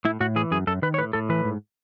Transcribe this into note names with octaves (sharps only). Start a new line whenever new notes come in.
A2 E4
A2 F#4
E3 G#4
F#2 G#4
F#2 A4
D#3 B4
C#5
A2 B4
A2 A4
E3 B4
G#2